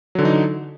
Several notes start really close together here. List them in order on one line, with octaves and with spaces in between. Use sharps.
F#3 D3 E3 D#4